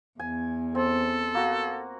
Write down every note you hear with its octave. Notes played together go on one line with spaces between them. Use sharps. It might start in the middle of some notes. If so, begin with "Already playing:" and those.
E2 G#5
C4 A4
A#3 F#4